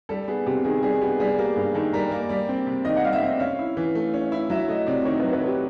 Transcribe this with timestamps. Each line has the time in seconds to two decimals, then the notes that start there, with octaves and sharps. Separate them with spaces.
0.09 G3 A4
0.28 B3 G#4
0.46 C3 G4
0.64 D#3 G#4
0.82 G3 G#4
1.01 B3 G4
1.19 G3 G#4
1.38 A#3 G4
1.56 G2 G#4
1.74 D#3 A4
1.93 G3 A#4
2.11 A#3
2.29 G3 D5
2.49 C4
2.67 C3
2.85 D#3 D#5
2.96 F#5
3.04 G3 F5
3.13 E5
3.22 C4
3.40 C#4 F5
3.59 E4
3.77 E3
3.95 A3
4.14 C#4
4.32 E4
4.50 F#3 E5
4.68 A3 D#5
4.87 C3 D5
5.05 D#3 C#5
5.20 F#3 B4
5.33 B4
5.42 A3 G4